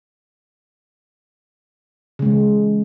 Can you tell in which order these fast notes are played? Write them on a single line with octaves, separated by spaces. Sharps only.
C#3 G#3 E3